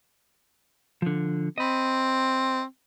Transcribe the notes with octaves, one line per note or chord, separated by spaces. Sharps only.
D3 F3
C4 D#5 B5